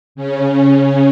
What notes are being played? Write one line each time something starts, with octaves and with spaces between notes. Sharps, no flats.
C#3 C#4